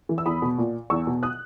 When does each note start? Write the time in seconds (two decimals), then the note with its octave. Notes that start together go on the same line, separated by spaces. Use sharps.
0.09 E3
0.18 E6
0.26 E2 B5 D#6
0.42 B2
0.58 A#2
0.90 E2 C#6 E6
1.07 B2
1.23 D#6 F#6